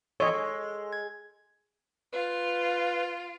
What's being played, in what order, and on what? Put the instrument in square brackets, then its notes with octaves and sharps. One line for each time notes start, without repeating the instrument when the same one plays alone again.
[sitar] E2 A#2 D#3 [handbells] A4 C6 [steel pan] C#5 D#5
[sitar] G#3
[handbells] G#6
[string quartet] F4 [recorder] B4